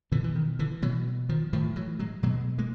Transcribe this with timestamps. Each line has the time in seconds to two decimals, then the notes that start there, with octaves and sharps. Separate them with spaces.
0.12 B2 D3 E3
0.24 E3
0.35 D#3
0.59 D3 E3
0.82 B2 E3 F#3
1.29 D#3 F3
1.53 A2 D#3 F3
1.76 E3 F#3
1.99 F#3 G#3
2.23 B2 F#3 G#3
2.58 G#3 A#3